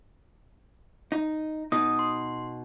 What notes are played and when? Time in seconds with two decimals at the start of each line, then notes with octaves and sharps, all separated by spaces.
1.12 D#4
1.72 B2 D#4 D#6
1.99 C6